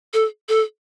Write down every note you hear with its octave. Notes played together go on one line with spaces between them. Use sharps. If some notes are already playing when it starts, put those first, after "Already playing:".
A4
A4